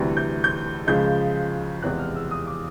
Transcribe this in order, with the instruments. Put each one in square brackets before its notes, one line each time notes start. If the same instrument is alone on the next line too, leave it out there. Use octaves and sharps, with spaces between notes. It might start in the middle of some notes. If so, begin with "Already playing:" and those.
Already playing: [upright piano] D2 C3 E3 G3
G6
G6
C#2 C#3 F3 G#3 G6
E2 C3 F3 G#3 F#6
F6
E6
D#6
D6